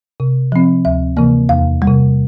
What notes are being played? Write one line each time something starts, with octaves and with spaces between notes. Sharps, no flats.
C3
F3 C4
D2 E5
C3 E3 A#3
E2 F5
G3
C3